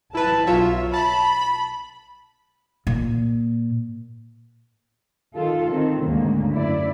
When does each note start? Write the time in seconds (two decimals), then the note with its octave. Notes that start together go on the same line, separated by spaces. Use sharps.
0.15 E4 B4 A5
0.47 B1 F4 C#5 E5
0.94 A5 B5
2.87 A#2
5.35 D#3 F4 A4
5.68 D#3 C4
6.02 D2 G#2 C#3 A#3
6.53 F#2 E4 D5